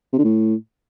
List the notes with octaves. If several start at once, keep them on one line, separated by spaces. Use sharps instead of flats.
C3
D3
A2